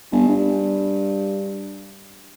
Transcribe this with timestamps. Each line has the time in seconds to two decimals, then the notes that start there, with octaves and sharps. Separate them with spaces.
0.12 G1
0.28 G2